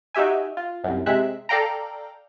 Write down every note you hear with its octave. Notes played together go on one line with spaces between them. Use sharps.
D#4 F#4 G4 E5 G#5
F4
C2 F#2
C3 G#3 E5 F#6
A4 D5 F5 G5 A#5